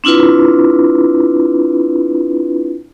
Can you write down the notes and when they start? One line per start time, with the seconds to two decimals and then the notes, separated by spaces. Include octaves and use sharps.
0.04 C4 D4 E4 F4 B4